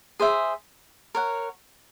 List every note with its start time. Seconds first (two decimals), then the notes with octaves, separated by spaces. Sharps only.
0.20 G#4 C5 E5
1.15 A#4 C#5 F#5